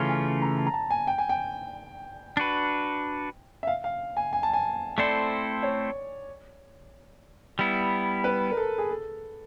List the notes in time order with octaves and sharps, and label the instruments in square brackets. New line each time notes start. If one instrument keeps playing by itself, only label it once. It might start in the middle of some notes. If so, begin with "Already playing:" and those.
Already playing: [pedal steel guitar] C#3 E3 A3 C#4 F4
[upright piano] G#5
A#5
A5
A#5
A5
G#5
G5
G#5
G5
[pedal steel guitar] D4 F#4 B4
[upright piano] E5
F5
F5
G#5
G#5
A5
G#5
[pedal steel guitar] A3 C4 E4 A4 C5 [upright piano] D5
[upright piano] C#5
[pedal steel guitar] G3 B3 E4
[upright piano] B4
A#4
A4
G#4
A4